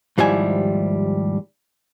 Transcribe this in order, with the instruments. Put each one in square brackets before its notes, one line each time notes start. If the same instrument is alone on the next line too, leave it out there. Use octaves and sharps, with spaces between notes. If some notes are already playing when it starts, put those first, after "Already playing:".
[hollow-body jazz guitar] D#2 G#2 F3 G3 E4 G#5